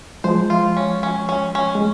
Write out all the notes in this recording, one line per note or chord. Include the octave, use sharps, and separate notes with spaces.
F3 G#3 C5
F4
C#4
C#4
C#4
C#4
G#3